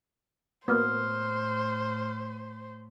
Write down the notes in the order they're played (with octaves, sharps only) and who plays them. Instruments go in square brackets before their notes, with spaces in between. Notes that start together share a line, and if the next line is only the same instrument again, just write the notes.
[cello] A2 [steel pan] A#3 B3 [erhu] C5 [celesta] D#6 F6